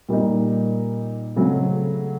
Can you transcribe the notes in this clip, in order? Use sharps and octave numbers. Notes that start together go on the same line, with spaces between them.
A#2 G3 A#3 D#4
C#3 F#3 A3 C4